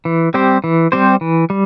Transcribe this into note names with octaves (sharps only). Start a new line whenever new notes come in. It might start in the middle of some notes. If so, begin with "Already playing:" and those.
E3
G3 C4 G4 C5
E3
G3 C4 G4 C5
E3
G3